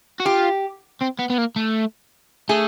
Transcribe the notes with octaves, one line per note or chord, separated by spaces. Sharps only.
F#4
F4 G4
C4
B3
B3
A#3
A3
A3 G#4